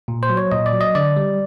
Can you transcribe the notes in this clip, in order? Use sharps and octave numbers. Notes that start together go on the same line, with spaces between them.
A#2
C5
F#3
C#5
A#2 D#5
D5
F#3
D#5
D3 D5
G3